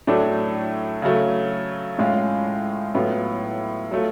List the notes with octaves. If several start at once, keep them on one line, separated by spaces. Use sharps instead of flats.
A2 F#3 A3 D4
C#3 F#3 A3
A2 G#3 C#4 F4
A2 F#3 B3 F4
F#3 A3 F4